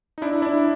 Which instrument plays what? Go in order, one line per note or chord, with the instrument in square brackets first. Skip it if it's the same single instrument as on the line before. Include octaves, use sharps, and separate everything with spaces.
[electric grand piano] D#4
D4 E4
D4 E4